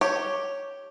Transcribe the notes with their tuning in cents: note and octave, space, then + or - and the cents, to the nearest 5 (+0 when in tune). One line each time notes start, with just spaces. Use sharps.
G4 +0 C#5 +0